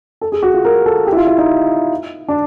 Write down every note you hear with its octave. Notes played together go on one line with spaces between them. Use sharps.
A4
G#4
F#4
F4
A#4
A4
G4
E4
F4
E4
D#4
D4